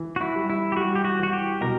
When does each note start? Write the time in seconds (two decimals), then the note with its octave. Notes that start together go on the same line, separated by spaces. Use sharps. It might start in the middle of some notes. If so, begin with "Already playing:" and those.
Already playing: E3
0.16 F#4
0.21 E4
0.36 G3
0.50 E4
0.72 G4
0.77 G3 F#4
0.95 G4
1.05 F#4
1.19 E3 F#4
1.33 G4
1.61 B2 A#4